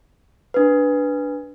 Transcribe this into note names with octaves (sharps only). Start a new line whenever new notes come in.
D4 B4